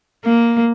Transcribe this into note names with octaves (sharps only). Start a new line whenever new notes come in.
A#3